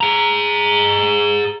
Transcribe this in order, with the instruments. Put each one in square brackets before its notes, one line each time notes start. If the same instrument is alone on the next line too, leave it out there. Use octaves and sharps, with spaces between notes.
[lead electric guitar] G#4 A#5